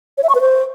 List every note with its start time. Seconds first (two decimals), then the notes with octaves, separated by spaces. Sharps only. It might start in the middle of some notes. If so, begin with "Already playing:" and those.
0.18 C#5
0.23 E5
0.29 C#6
0.35 B4
0.41 C5